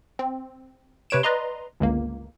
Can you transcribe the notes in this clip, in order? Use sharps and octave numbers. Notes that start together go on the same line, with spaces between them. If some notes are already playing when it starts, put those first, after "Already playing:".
C4
C3 B4 C#5 D7 E7
B4 D5 D#5 A#5 C6
G1 C#2 A#3